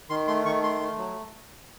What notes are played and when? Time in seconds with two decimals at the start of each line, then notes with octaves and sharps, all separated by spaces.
0.10 D#3 C6
0.27 A3 C6
0.46 D#3 C#6
0.63 A3 C6
0.80 A3
0.98 F#3